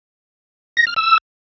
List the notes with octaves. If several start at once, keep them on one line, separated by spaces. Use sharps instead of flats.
A#6
F6
E6